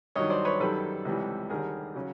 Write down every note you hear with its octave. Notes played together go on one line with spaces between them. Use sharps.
G2 D#3 F#3 C#5 D#5
C5 D5
B4 C#5
F#2 D#3 G3 A4 B4
C#2 C3 E3 G3
D#2 D3 G3 G#4 A#4
C#3 F#3